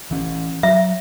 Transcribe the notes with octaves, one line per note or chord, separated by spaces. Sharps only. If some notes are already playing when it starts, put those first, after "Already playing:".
E3 C#4
F#3 E5